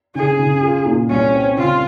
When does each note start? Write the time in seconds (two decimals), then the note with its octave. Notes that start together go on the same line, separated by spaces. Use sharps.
0.15 C#3 G#4
0.39 C#3
0.63 F4
0.86 A#2
1.10 C2 C#4
1.33 C4
1.57 C#3 F4